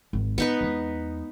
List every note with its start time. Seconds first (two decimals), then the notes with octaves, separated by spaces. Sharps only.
0.13 G#1 F#3
0.38 G#2 B3 D#4 B4
0.61 E2 G#3